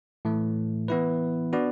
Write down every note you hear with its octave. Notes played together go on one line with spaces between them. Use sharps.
A2 E3 A3
E3 B3 E4 B4
B3 D4 F#4 B4 D5